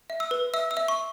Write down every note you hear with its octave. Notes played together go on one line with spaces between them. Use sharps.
E5
E6
B4
E5 E6
E6
E5
C#6